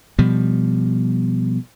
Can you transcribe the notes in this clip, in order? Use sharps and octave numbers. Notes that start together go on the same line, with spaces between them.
B2 F3 G3